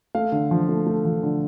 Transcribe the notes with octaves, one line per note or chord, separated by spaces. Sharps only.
A3 F5
D3
F3
A3
A3
F3
D3